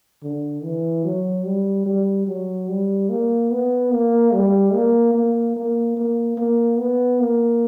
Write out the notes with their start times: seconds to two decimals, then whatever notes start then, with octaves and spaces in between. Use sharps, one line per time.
0.23 D3
0.63 E3
1.05 F#3
1.45 G3
1.86 G3
2.27 F#3
2.68 G3
3.10 A#3
3.51 B3
3.92 A#3
4.33 G3
4.74 A#3
5.15 A#3
5.56 A#3
5.97 A#3
6.37 A#3
6.79 B3
7.20 A#3